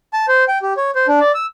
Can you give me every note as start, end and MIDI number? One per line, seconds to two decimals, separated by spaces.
0.13 0.26 81
0.28 0.44 72
0.48 0.58 79
0.62 0.73 67
0.77 0.91 73
0.95 1.07 72
1.08 1.19 62
1.20 1.32 74
1.34 1.46 88